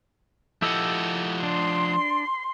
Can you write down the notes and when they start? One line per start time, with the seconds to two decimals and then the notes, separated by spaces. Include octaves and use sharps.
0.62 F3 E4 G4 A4 D#5 F#5
1.43 D4 C6